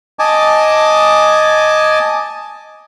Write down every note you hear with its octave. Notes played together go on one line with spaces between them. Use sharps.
D#5 G#5 A5 D6